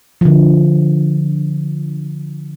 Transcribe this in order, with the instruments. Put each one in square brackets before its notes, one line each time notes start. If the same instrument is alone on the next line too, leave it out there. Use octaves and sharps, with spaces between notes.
[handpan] D3 F3